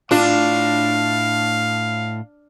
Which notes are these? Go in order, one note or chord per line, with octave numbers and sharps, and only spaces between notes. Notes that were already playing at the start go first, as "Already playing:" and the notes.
A2 D4 F4 F5